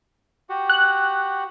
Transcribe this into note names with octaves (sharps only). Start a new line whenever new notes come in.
F#4 G4 F#5
F#6